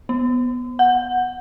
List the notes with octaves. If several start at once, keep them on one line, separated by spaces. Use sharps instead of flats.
B3
F#5